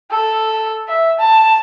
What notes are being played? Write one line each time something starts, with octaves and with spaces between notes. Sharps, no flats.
A4
E5
A5